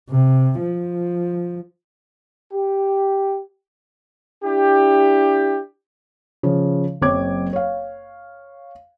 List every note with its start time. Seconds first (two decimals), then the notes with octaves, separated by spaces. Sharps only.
0.10 C3
0.60 F3
2.52 G4
4.44 D4 E4 G4
6.43 C#3 F3
7.01 F#1 F#2 C4 C#5 D6 G#6
7.53 C#5 F5